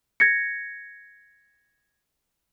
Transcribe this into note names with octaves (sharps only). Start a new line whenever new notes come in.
G#6 A#6 C#7